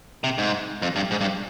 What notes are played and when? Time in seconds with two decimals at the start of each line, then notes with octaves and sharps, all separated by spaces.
0.24 C3
0.38 G#2
0.82 F2
0.96 G2
1.11 G#2
1.21 G2